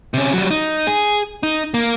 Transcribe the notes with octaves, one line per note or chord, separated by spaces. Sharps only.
C3 C#4
F#3 G3
D#4
G#4
D#4
A#3